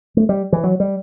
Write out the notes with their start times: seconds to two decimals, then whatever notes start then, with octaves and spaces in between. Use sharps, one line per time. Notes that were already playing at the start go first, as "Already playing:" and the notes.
0.17 A3
0.29 G3
0.53 E3
0.64 F#3
0.80 G3